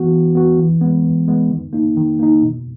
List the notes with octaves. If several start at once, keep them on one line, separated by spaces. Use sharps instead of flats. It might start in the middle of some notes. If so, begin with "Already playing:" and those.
Already playing: E3 B3 F#4
E3
B3 F#4
E3
G#3 B3
E3
G#3 B3
D#3
A#3 D#4
D#3
A#3 D#4
B2